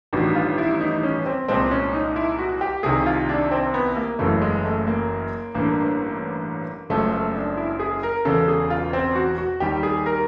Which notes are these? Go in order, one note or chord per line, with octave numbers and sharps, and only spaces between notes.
A1 G2 D#3 G3 F#4
F4
E4
D#4
C#4
C4
C2 A#2 F3 G#3 C4
C#4
D#4
E4
F#4
G4
C2 C3 D#3 G#4
F4
D4
C4
B3
A#3
F#1 F#2 C#3 E3 A3
G#3
A3
A#3
A1 G2 D3 A#3
F#1 F#2 C#3 F3 G#3 A3
A3
D4
E4
G#4
A#4
E1 E2 C#3 A4
G#4
F4
C4
F#4
F#4
D#2 D#3 G3 G4
G#4
A#4